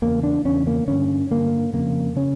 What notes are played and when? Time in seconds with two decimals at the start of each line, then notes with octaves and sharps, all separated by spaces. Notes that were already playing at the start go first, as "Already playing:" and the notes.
0.02 E2 C#3 A#3
0.23 D4
0.45 E2 C#3 C#4
0.67 A#3
0.88 G2 D3 C#4
1.31 G2 D3 A#3
1.73 F2 C#3 A#3
2.16 C#3 C#4